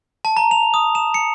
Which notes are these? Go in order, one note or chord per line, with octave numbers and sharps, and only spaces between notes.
A5
A#5
F7
D#6
E7
C#7